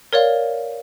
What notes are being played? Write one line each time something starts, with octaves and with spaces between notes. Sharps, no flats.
A#4 C#5 D5 F5